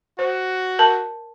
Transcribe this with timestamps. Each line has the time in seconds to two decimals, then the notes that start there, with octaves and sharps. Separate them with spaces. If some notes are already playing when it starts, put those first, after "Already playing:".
0.19 F#4 C5
0.79 A#4 A5